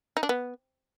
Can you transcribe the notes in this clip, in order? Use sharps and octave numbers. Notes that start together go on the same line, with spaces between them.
D#4
D4
B3